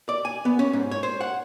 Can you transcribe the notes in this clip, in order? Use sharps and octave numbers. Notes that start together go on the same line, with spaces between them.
D5
G#5
B3
C#4
G#2
C#5
C5
F#5